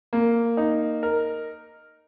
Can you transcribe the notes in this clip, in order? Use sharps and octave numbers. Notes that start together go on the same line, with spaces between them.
A#3
D#4
A#4